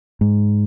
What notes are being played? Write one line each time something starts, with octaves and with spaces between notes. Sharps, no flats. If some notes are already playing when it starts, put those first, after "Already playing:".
G#2